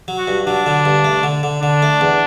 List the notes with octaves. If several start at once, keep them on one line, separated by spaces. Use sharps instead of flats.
F#3
F#4
G2
F#3 D4
D3
G2
A3
D3
D3
D3 D4
A3
E2